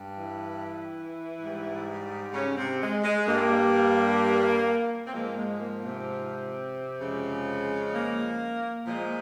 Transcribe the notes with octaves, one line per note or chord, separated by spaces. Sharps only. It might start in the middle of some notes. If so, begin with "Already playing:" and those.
Already playing: G2
E3 E4
G#2 G3
C#3 C#4
C3 C4
G#3
G#3
G2 G3 A#3
C4
G#2 F3 G#3 A#3
G#3
A#3
C3 C4
F2 C#3 F3 G#3
A#3
A#2 F3 G#3 A#3